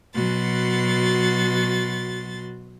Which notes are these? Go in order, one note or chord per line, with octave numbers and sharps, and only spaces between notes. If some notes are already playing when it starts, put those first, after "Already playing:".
B2 F#3 F#4 C6 A6